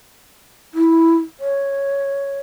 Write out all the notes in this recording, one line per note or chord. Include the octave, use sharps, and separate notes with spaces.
E4
C#5